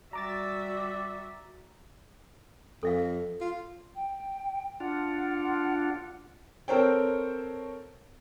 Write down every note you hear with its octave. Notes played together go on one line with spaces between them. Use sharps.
G3 F#4 D5 E5 A#5 D6 A6
F2 A4 E5 F5
F4
G5
D4 F4 F#5
C4 A4 A#4 C5 C#5 G5